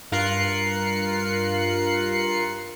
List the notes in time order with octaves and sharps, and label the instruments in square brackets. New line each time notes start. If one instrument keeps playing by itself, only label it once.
[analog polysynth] G2 F4 A#4 F#6 C7 C#7